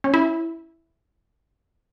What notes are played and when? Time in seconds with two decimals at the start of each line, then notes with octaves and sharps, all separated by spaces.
0.04 C#4
0.14 E4